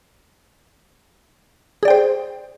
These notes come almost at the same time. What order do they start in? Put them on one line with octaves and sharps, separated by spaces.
G#4 D5 G5 C5